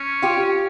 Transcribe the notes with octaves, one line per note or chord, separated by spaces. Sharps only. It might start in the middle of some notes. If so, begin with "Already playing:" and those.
Already playing: C#4
F4 G4